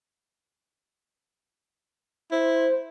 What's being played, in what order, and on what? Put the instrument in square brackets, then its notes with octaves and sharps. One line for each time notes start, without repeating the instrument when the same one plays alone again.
[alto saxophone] E4 [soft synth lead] C5